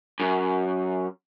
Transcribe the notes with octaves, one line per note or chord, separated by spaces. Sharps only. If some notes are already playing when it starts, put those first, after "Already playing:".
F#2